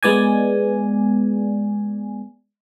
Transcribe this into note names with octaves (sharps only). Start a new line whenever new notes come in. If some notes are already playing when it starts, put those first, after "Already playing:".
G#3 B3 D5 G#5